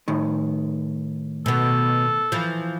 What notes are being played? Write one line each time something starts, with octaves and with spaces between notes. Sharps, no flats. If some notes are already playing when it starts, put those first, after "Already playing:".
A2 D#3
B2 B3 A4
E3 F3